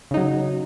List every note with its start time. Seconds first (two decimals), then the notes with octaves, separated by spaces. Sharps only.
0.11 C#3
0.14 D#4
0.17 F#3